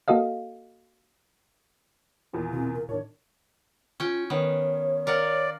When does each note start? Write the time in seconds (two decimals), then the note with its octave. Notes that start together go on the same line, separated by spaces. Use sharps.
0.08 A#3 F#4 A4 D#5 F5
2.33 E2 A#2 D#3
2.53 B2 C4
2.74 A#4
2.89 A2 D#3 D4 A#4 C#5
4.00 C#4 F4 G5
4.30 D#3 B3 C#5
5.07 A#4 D5 F5 F#5